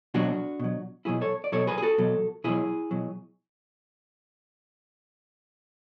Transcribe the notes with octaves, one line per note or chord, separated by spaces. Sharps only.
B2 F#3 D4 F#4
B2 F#3
B2 F#3 E4 G#4
A4 C#5
D5
B2 F#3 A4 C#5
G#4 B4
G#4
F#4 A4
B2 F#3
B2 F#3 E4 G#4
B2 F#3